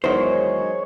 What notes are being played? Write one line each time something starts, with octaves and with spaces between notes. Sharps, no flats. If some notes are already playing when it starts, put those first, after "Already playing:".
E2 D#3 F#3 G#3 G#4 C5 C#5